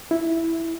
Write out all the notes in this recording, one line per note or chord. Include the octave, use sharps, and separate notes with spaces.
E4